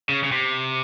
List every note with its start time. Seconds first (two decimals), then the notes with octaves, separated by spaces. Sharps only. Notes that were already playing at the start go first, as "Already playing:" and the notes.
0.09 C#3
0.23 C#3
0.32 C3